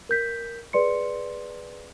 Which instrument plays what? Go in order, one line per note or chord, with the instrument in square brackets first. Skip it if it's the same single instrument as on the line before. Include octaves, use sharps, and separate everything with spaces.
[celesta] A#4 G6 B6
G#4 B4 D5 C6 C#7